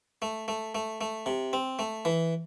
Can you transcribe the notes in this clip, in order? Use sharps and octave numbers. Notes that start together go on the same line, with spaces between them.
A3
A3
A3
A3
C3
C4
A3
E3